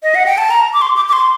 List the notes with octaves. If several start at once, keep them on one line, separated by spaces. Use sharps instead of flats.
D#5
F#5
G5
A5
A#5
D6
C6
D6
D6
C6